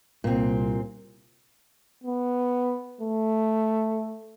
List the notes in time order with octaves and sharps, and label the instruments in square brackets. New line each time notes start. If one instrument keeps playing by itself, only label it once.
[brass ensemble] C2 [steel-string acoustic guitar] A#2 C4
[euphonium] B3
A3